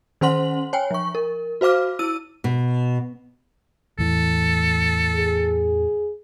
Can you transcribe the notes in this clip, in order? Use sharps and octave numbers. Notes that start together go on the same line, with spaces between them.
D#3 C#4 C5 F#5 C6 F#7
C#5 G5 G#5
F3 C#6
A#4
F#4 C5 F5 D6 F6
E4 E6 D#7
B2
E2 A2 E3 A4
G#4